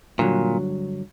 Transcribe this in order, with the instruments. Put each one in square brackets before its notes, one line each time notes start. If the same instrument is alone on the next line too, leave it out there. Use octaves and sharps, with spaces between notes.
[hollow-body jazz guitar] G2 D3 F#3 [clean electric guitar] A#2